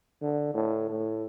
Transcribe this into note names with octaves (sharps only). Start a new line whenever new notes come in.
D3
A2
A2